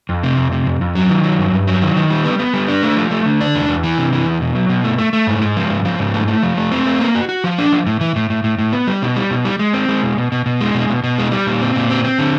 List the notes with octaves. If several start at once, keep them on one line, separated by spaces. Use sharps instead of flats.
F2
C3
F2
C3
F2
F2
F#3
D#3
F#3
G2
G2
F#3
D#3
D#3
G3
B3
B3
G3
D4
A3
F3
A3
D3
D4
E2
E2
E3
C3
E3
E2
B2
F#3
B2
A3
A3
A3
G#2
G#3
F3
G#2
F3
G#2
A3
A3
F3
A3
C4
A3
A#3
F#4
F#4
F3
D4
F3
A2
E3
A2
A2
A2
A2
B3
G3
B2
G3
B2
G3
G#3
C4
G#3
B2
B2
B2
B2
G#3
B2
B2
B2
G#3
G3
A#2
C4
A#2
C4
C4
D3